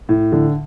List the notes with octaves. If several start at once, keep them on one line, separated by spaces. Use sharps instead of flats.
A2
D3